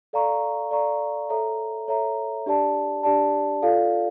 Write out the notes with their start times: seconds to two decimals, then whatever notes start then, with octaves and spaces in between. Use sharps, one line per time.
0.13 A4 D5 F5 A#5 C#6
0.71 A4 D5 F5 A#5 C#6
1.29 A4 C#5 E5 A#5
1.88 A4 C#5 E5 A#5
2.46 D4 G4 D5 A5
3.03 D4 G4 D5 A5
3.62 F4 A4 D5 F5